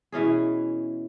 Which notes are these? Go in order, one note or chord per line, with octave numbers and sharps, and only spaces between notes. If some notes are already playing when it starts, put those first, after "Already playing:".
B2 E3 C#4 G#4